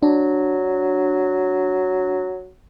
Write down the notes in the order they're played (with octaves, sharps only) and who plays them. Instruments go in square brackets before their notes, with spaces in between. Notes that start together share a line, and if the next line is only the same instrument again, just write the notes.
[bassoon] F#3 [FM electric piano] D4